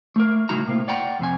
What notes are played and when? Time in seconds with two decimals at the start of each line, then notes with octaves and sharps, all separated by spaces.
0.16 A3 A#4
0.49 A2 C#3 G3 D#4 F#4 A#5
0.67 A2 C3 A#3
0.88 D5 F#5 G5 A#5
1.19 F2 C3 G#5